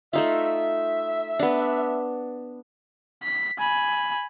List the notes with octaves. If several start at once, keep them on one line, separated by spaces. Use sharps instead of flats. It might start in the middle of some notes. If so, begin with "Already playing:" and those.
A3 D#4 F4 E5
B3 D4
B6
G#5 B5